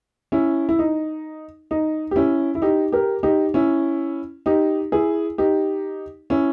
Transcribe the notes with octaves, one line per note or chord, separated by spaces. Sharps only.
C#4 E4
E4
D#4
D#4
G4
C#4 E4
E4
D#4 G4
G4 A#4
D#4 G4
C#4 E4
D#4 G4
E4 G#4
D#4 G4
C#4 E4